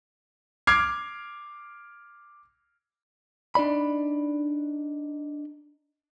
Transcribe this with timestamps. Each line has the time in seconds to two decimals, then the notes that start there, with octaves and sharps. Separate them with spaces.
0.67 D6 F6 G#6 C7
3.55 D4 D#4 D5 B5